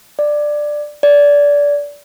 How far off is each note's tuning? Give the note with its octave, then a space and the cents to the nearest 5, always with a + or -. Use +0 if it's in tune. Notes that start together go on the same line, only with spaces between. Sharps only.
D5 +10
D5 -20